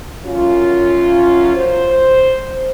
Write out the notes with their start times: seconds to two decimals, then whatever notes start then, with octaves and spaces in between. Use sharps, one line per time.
0.25 F#2 F#3 C#4 F4
1.55 C5